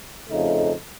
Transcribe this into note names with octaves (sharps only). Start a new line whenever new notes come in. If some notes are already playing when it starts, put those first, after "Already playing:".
F2 C#3 A3 D#4